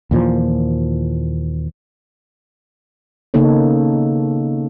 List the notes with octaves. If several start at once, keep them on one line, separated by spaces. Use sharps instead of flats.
D#2 A#2 E3 F3
C#3 A#3 B3 D#4 A4 C#5